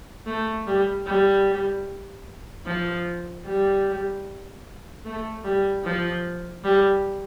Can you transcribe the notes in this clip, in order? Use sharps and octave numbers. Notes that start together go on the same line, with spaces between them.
A3
G3
G3
F3
G3
A3
G3
F3
G3